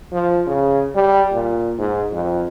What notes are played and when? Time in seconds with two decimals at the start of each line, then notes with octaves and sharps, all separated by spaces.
0.11 F3
0.46 C#3
0.95 G3
1.32 A#2
1.78 G#2
2.12 F2